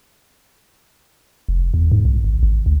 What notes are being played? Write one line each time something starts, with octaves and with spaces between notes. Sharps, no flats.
F1
E2
G#2
C2
G#1
G#1
D2